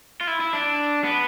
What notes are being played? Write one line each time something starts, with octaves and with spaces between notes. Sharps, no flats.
F4
E4
E4
D4
B3